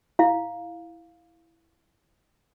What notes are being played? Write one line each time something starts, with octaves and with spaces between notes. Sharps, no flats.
E4 F5